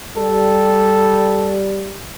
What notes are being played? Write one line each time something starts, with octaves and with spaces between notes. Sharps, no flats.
G3 A4